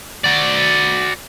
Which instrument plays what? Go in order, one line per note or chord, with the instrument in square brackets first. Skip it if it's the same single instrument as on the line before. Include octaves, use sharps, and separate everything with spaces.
[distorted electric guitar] F#4 D5